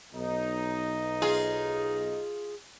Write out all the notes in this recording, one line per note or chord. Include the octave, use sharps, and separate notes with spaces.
B1 D#4
F4 G#4